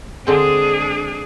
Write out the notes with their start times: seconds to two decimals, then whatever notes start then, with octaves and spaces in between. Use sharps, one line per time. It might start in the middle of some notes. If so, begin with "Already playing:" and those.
0.27 D3 G#3 C4 D4 G#4